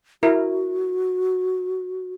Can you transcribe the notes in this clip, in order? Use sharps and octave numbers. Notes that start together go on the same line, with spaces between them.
E4 F#4 A#4